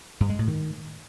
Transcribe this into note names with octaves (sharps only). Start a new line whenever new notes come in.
G2
G#3
A2
D#3